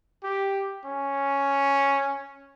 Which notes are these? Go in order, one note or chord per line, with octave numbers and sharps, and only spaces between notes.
G4
C#4